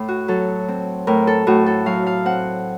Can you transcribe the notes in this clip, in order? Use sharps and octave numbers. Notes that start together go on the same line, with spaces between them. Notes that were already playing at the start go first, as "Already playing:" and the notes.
Already playing: A2
F#4
F#3 A4
C4
A2 A#4
A4
A2 F#4
A4
F#3 F5
F5
C4 F#5